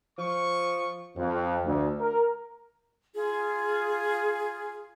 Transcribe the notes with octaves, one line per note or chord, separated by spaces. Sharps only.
F3 C#6
F2
D2
A#4
F4 G#4